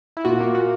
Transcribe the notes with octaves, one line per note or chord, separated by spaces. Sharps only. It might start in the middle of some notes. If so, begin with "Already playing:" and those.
E4
A#2 F#4
A#3
A#2 F#4